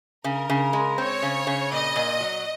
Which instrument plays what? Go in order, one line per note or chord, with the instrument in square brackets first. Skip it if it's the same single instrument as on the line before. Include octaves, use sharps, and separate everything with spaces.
[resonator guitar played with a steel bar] C#3 [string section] A#4
[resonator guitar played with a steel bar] C#3
G#3
[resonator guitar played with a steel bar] C4 [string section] C#5
[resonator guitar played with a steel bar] C#3
C#3
[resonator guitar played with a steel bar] A#2 [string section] D#5
[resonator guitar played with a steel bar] A#2
F#3